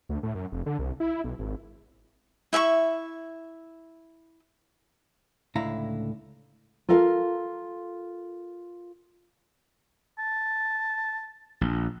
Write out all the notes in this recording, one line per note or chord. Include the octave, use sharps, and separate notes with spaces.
D2
A2
F#2
F1
D3
C2
E4
B1
G#1
E4 E5 G5 C#6
C#2 A2 D3 E4 F5 A#5
F4 A4 A#4 F5
A5
A#1